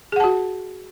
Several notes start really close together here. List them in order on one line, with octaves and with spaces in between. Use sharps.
G#4 F#5 A5 F#4